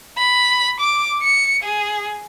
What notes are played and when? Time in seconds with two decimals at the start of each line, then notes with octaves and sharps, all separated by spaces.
0.17 B5
0.80 D6
1.22 C#7
1.63 G#4